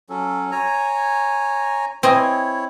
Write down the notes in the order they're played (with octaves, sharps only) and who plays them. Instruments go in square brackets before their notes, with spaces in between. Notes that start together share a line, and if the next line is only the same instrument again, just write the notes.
[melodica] F#3 C#4 A4
C#5 G#5 A#5
[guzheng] C4 D#5 G#5 [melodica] E4 C#5